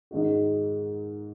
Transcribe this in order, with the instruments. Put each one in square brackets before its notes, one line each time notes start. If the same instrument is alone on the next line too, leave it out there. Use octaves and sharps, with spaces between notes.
[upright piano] G#2 D#3 G#3 D#4 F#4